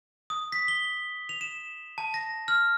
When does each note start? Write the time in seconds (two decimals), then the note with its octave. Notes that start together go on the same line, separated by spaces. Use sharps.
0.30 D#6
0.52 B6
0.68 G7
1.29 F7
1.41 E7
1.98 A5
2.14 A#6
2.48 F6